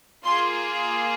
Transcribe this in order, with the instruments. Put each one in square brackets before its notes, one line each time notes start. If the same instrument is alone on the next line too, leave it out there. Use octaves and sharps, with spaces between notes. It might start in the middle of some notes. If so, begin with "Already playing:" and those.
[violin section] A#3 F4 G#4 C6